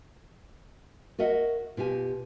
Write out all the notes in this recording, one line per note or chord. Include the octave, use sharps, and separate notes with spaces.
F#4 A#4 D#5 E5 F#5
B2 F4 G4 G#5